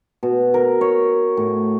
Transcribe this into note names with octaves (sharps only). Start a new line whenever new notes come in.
B2
A#4
C#5
A2